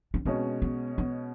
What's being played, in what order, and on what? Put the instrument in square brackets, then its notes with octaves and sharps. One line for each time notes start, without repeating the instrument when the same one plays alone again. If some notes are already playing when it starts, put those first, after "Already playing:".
[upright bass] C#4
[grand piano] B2 G#3 C#4 [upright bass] C4
[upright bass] B3
B3